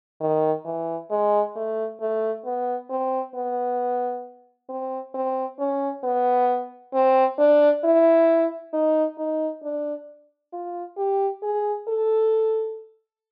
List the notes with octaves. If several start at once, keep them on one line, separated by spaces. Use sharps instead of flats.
D#3
E3
G#3
A3
A3
B3
C4
B3
C4
C4
C#4
B3
C4
D4
E4
D#4
D#4
D4
F4
G4
G#4
A4